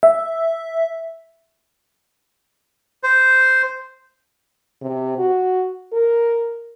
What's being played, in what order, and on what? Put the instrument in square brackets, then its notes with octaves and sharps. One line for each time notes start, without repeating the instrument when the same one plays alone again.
[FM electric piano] E5
[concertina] C5
[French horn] C3
F#4
A#4